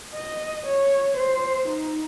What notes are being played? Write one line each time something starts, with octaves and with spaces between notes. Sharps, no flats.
D#5
C#5
C5
D#4